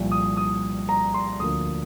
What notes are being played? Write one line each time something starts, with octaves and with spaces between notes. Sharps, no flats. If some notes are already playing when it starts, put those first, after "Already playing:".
Already playing: C2 A#2 F3
D#6
D#6
A#5
C6
D2 D3 F3 A#3 D#6